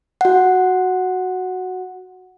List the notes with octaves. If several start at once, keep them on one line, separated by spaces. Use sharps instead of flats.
F#4 F#5